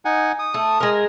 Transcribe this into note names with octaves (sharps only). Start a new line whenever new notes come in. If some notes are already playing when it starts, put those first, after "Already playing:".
D#4 F#5 G#5
D#6
A3
G#3 A#4